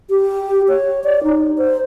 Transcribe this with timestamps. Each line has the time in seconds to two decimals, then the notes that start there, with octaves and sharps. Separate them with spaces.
0.10 G4
0.69 C#5
1.04 D5
1.24 D#4
1.58 C5